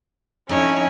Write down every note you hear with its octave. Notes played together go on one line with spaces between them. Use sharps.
F2 C#4 D#4 E4 C#5